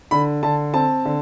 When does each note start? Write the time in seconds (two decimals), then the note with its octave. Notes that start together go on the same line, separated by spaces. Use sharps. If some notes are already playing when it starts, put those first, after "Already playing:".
0.11 D3 B5
0.43 D3 A5
0.74 C4 A5
1.05 D3